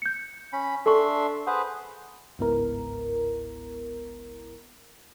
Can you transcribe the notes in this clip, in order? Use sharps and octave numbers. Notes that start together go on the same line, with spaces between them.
G6 C#7
C#4 B5
D4 A4 E5 C6 C#6
G#4 B4 C5 F#5
G1 C#2 G#2 B3 E4 A#4